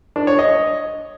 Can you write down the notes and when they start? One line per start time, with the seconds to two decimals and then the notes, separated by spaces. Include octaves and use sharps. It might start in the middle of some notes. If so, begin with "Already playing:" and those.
0.16 D4
0.27 C#5
0.39 D#5